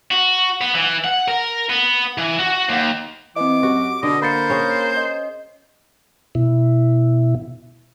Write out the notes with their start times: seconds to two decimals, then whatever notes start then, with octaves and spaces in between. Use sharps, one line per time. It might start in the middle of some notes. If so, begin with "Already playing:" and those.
0.11 F#4
0.61 B3
0.74 E3
1.04 F#5
1.28 A#4
1.69 B3
2.18 E3
2.39 F#4
2.69 D#2
3.36 E3 C4 D#5 D6
3.63 F#2 F#4 G4
4.03 B2 D3 D#5
4.22 A#3 C5 B5 A6 C#7
4.50 C#4 G#4 A#4
4.97 D#5
6.35 B2 E4